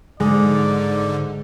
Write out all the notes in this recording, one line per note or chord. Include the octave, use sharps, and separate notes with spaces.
G#2 D3 G#3 D5